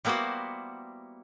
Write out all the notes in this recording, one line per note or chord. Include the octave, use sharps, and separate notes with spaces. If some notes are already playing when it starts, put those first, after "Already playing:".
G3 A#3 B3 E4 F#4 C5